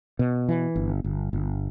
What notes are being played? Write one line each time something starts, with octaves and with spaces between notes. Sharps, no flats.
B2
E3
G1
G1
G1